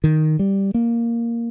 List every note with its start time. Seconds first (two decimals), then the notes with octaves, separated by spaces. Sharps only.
0.04 D#3
0.39 G3
0.74 A#3